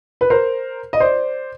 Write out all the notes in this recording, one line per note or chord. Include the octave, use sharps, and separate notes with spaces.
B4
A#4 C5
D#5
C5 D5